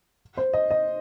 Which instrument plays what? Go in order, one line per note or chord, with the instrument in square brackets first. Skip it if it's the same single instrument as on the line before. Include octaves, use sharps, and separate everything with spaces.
[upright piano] C5
D#5
D#5